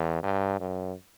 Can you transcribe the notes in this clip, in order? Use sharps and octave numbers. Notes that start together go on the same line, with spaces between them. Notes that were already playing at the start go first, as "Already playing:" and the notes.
Already playing: E2
G2
F#2